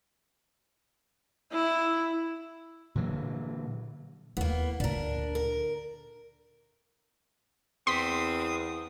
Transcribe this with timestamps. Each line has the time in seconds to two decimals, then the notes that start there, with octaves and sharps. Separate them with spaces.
1.52 E4
2.95 A#2 D3 E3 F#3
4.37 D#2 A#3 B3 E4
4.80 D2 A#2 D4 A#4
5.35 A#4
7.87 E2 C4 C6 D#6 B6